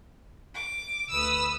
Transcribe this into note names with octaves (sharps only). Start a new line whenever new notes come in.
D6
D2 B4 D#6 E6